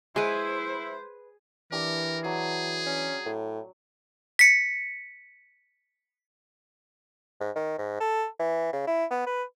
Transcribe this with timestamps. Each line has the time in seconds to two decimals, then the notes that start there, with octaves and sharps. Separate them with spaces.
0.16 G#3 E4 G#4 B4 C5
1.72 E3 D4 G4 A#4
2.24 F#3 G#4 G5
2.86 C#4
3.26 A2
4.39 B6 C#7
7.41 G#2
7.56 D#3
7.78 G#2
8.00 A4
8.40 E3
8.73 C#3
8.87 E4
9.11 B3
9.27 B4